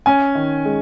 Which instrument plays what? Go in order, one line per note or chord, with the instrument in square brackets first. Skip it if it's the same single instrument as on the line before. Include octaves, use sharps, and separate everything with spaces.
[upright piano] C#4 G#5
D#3
G#3